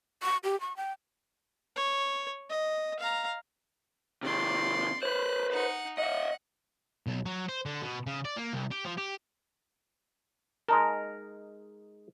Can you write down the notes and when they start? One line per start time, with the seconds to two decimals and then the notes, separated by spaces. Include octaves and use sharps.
0.23 C#6
0.44 G4
0.61 C#6
0.77 G5
1.76 C#5
2.50 D#5
2.99 F5 A#5
4.23 C3 D#3 D5 C6
5.03 B4 C5 F#6
5.50 D#4 F#5
5.98 D#5 E5 F#5
7.07 B1
7.26 F#3
7.49 C5
7.66 D3
7.83 B2
8.07 C#3
8.25 D5
8.36 A#3
8.53 C2
8.71 G4
8.85 F3
8.98 G4
10.69 G#3 D#4 A#4 A5